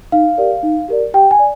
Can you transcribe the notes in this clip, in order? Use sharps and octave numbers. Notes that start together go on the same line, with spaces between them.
D#4 F5
G4 A#4 D5
D#4
G4 A#4 D5
G4 G5
G#5
D5